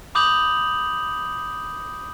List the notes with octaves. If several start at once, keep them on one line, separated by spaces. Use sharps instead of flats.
B5 D6 D#6 G6 F7 F#7